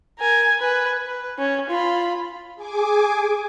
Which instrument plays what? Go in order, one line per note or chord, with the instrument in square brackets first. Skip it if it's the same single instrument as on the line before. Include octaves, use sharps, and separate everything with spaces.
[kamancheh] A#4 G#5
B4 G#5
B4
C#4
F4 B5
[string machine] G#4 G#5 D6